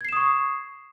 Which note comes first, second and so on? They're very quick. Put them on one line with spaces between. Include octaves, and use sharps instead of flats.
G#6 C7 E7 D#6 C#6